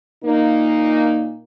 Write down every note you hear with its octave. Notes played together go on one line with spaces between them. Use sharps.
A#2 A#3 D#4